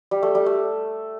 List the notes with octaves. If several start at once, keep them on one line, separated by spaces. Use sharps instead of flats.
G3
A3
G3
A3